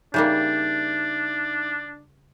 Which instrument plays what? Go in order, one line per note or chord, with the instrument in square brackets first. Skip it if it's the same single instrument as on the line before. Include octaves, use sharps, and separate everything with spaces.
[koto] C#3 G3 A#3 [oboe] D4 [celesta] D#4 E5 G6